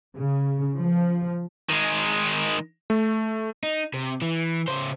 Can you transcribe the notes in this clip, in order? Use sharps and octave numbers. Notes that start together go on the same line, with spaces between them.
C#3
F3
D#3 G#3
A3
D#4
C3
E3
C#3 C5